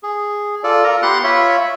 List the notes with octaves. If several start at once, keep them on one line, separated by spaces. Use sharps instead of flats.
G#4
F4 A4 D5
F4 A#4 A#5
B3 G4 F#5 C6 F#6
F4 C#5 E5 B5